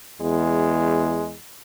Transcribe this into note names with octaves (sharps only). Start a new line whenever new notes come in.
E2 G#3